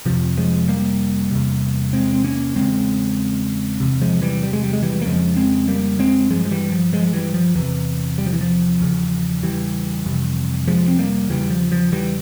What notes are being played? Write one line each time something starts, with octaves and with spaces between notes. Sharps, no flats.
F2 C3 F3
F3 G#3
G3 A#3
E2 C3
G#3 C4
C4
A#3 C#4
E2 C#3 G#3 C4
E2 C3
F3 G#3
E3 G3
G3
G#3
G3
G#3
E3 G3
A#3
F2 C#3 F3 G#3
G#3 C4
G3 A#3
G#3 C4
G2 F3 G#3
F3
E3 G3
F3
F3 G#3
G#3
E3 G3
F3
E2 C3 E3
G3
F3
E3
F3
E2 C#3
E3 G3
F2 C3
F3 G#3
C4
G3 A#3
E2 C#3 E3 G3
F3
F3
E3 G3